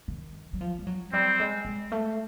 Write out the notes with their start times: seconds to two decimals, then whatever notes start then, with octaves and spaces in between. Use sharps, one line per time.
0.08 D#3
0.53 F#3
0.61 F3
0.79 G3
0.87 F#3
1.13 G3 C4
1.40 G#3
1.65 G#3
1.92 A3